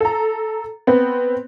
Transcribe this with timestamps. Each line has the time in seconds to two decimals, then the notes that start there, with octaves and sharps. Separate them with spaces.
0.01 A4 A#5
0.87 B3 C4